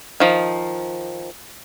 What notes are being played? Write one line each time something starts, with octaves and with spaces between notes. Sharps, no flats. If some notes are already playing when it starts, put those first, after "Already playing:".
D#3 F3